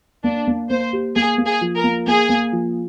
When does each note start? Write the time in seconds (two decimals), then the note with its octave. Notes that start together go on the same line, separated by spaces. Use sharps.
0.24 A#3 D4
0.47 A#3
0.70 A#3 C5
0.93 G4
1.16 A#3 G#4
1.38 A#3
1.46 G#4
1.61 F3
1.76 A#4
1.84 A#3
2.07 A#3 G#4
2.29 A#3
2.52 F3